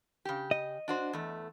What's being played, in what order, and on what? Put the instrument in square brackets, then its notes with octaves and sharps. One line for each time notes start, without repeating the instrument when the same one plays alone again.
[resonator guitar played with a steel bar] C#3 G4
[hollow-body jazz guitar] D#5
[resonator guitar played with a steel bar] D4 F#4 C5
E2 A3